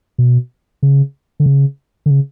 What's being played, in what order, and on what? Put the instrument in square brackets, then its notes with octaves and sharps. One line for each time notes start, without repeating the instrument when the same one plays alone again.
[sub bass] B2
C#3
D3
C#3
D3
C#3